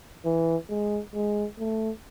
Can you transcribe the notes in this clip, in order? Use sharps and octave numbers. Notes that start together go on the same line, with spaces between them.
E3
G#3
G#3
A3